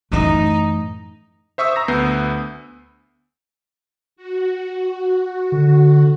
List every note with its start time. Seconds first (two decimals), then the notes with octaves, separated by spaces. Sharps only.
0.12 F#2 A2 E3 A3 D#4
1.58 C5 E5 C#6 D#6 E6
1.76 A#5 A#6
1.88 D2 B3 G6 C7
4.16 F#4
5.52 D3